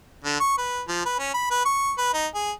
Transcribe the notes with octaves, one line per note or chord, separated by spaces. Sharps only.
D3
C#6
B4
F3
B4
C#4
B5
B4
C#6
B4
D#4
G#4